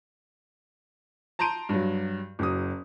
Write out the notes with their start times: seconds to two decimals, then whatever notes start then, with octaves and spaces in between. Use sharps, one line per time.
1.39 A5 A#5 C6 G6 D7 D#7
1.69 G2 F#3
2.39 F#1 F#3 D#6